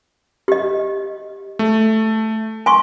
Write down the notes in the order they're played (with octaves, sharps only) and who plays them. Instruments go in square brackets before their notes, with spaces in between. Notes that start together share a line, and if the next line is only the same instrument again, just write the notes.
[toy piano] G4 D#5
[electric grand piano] A3
[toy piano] G#5 C6 C#6